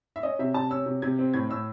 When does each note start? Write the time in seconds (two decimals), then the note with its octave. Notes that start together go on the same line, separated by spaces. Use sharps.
0.16 E5
0.23 C#4 D#5
0.39 C3 E5
0.54 C3 A5
0.70 C#4 E6
0.86 C3
1.02 C3 G#6
1.19 C4
1.34 A2 G#6
1.49 A2 E6